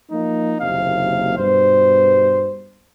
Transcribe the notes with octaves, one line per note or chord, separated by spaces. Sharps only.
F3 A#3 D#4
F#1 D#2 C3 F5
G2 B2 C5